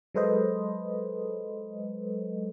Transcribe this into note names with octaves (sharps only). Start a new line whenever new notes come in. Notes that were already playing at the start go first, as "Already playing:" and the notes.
F#3 G#3 A4 B4 C5 D#5